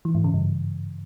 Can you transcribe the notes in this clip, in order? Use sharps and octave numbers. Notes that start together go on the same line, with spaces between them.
E3
G#2
C#3
G2